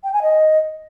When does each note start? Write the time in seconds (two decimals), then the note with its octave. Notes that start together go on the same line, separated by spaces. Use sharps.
0.04 G5
0.13 G#5
0.22 D#5